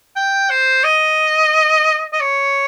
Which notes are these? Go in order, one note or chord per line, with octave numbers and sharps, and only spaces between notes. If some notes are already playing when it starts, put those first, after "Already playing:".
G5
C5
D#5
D#5
C#5